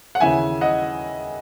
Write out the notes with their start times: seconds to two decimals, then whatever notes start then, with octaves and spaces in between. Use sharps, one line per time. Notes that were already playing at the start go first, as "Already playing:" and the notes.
0.15 F#5
0.20 D#2 C#3 E3 E5 G#5
0.61 D#5 F#5